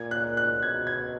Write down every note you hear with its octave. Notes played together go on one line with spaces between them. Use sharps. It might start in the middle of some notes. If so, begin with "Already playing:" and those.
Already playing: A#2 G#6
F#6
F#6
B2 G#6
G#6